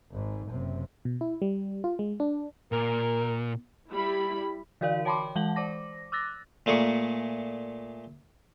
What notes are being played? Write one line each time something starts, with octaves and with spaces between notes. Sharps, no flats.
G#1 G#2
F#1 C3
B2
E4
G3
F4
G#3
D4
A#2 A#4
G3 E4 B5
D3 E3 F#4 A#4 D5 F5
C#5 G5 A5 B5 C6 D6
E3 G#3 F#5 A5 F#7
C5 D5 D6 A#6
D6 E6 F#6 A6 A#6
A#2 A3 A#3 G#4 C#6